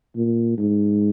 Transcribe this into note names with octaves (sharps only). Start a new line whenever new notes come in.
A#2
G#2